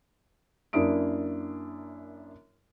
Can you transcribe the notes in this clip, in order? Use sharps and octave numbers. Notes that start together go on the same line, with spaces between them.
F#2 A#3 D4 E4 D#6 D7